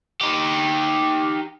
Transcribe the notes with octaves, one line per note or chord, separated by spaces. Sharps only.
D#4 G4